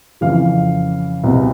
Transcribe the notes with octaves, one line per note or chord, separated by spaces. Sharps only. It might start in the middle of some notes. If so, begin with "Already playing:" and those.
F2 C#3 E3 F5
C2 B2